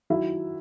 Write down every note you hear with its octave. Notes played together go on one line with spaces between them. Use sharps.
D#3 F#3 E4 E5